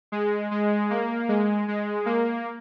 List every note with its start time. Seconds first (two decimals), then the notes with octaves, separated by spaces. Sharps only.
0.12 G#3
0.51 G#3
0.90 A#3
1.29 G#3
1.68 G#3
2.06 A#3